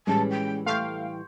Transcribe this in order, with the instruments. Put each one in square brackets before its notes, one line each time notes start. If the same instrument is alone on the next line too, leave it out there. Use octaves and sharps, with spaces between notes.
[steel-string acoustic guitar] A2 E3 G3 [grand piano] G#3 C#4 [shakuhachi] A5
[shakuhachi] G5
[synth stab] A3 F5 [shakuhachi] G5 [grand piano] C6 C#6 G6